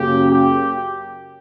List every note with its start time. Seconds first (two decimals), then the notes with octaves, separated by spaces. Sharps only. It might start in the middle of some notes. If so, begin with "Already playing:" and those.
Already playing: F#2 C#3 F#3 A#3 G4
0.30 G4